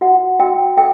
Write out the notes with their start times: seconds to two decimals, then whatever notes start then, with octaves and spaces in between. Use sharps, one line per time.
0.01 F#4 F#5
0.40 F#4 G5
0.77 A4 G5